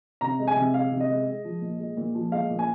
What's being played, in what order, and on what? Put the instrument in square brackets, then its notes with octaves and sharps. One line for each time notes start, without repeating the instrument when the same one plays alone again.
[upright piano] C3 A#5
G#3
G#5
C3
G#3 F5
C3
D#5
G#3
G#3
F3
A#2
G#3
A#2
F3
G#3 F5
A#2
G#5